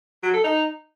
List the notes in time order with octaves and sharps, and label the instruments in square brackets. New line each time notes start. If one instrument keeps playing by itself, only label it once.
[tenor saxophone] F#3
A4
D#4